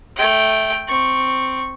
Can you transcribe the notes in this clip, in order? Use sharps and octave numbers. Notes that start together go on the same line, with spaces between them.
A3 G5
C4 C#6